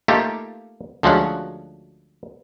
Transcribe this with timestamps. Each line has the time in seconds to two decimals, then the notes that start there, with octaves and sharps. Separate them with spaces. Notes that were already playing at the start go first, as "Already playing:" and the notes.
0.08 A3 A#3 D#4 F4 G4 A4
1.03 D2 F3 F#3 G#3 C#4 F#5